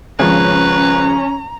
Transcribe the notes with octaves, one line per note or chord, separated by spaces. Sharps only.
G#1 C#3 F3 C#4 B4 A#5